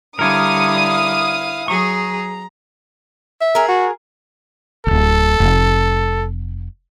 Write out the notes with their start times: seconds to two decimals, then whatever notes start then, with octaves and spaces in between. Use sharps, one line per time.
0.19 D3 G3 E4 A#4 C#5 F5 D#6
1.68 F#3 G#4 A#5 C#6
3.41 E5
3.55 G#4 A#4
3.68 F#4
4.87 D1 G#1 A4
5.40 F1